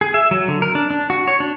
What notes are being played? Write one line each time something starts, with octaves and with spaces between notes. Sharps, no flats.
G#4
E5
F#3
D3
A#4
D4
D4
F#4
C#5
D4